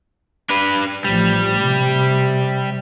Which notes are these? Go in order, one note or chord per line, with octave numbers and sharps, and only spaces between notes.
D4 B4
A1 F3 G3
C3